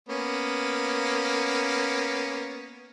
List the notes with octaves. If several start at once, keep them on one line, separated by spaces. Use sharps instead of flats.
A#3 B3 C#4